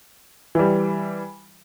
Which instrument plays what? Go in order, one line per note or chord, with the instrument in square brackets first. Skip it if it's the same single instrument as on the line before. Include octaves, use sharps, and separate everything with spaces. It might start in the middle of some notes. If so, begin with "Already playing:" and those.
[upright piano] E3 G3